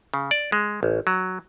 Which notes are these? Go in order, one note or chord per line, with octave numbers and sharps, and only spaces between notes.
C#3
D5
G#3
A1
F#3